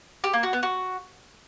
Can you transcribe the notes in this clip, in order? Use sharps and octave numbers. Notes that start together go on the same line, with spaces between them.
G4
A#3
F#4
B3
F#4